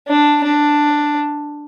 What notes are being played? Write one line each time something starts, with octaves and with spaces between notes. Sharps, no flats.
D4
D4